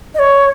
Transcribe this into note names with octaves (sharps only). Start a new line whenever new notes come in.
D#5
C#5